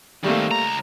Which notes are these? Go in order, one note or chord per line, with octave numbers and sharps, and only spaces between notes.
D#3 G3 A3 A#3 C4
C#2 A#5